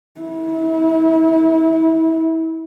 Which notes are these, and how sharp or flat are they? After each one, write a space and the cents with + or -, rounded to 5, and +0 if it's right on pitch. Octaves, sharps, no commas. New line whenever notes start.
E4 -35